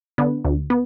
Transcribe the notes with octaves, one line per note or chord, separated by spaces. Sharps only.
D3 B3
D2
B3